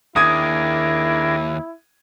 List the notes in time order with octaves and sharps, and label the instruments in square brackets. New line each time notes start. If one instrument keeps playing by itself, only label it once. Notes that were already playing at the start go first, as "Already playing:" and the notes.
[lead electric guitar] D#2 [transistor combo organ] D4 G#4 A#4 [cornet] E4 [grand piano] D#6 G#6